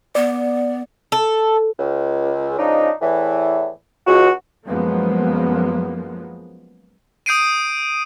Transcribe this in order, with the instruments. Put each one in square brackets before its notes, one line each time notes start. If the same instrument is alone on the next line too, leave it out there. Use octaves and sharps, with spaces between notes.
[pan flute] B3 [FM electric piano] D5
[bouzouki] A4
[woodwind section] C#2
C#3 F3 D4 D#4
E2 A2 E3
C#2 F#4
[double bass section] F#2 F3 G#3 A#3 B3
[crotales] D#6 G6 C7 D7 D#7